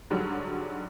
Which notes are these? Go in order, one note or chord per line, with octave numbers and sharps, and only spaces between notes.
G#2 D3 F#3 G3